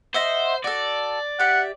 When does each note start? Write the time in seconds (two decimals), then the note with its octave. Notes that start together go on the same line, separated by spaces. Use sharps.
0.14 C5 D#5 E5 F#5
0.64 F#4 A4 D5
1.39 G4 E5 F#5